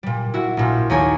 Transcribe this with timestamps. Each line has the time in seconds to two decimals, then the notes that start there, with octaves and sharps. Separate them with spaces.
0.03 A#2 G3
0.34 E4 F#4
0.57 A#1 A#2
0.90 D#2 A3 A#3 C#5 G#5 G#6